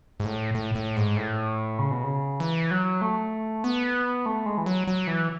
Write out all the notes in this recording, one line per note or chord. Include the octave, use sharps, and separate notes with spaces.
G#2
A2
A2
A2
G#2
A2
C#3
B2
C#3
E3
F#3
A3
B3
A3
G#3
E3
F#3
F#3
E3